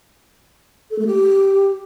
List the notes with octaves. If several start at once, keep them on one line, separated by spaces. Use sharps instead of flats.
A4
A3
G4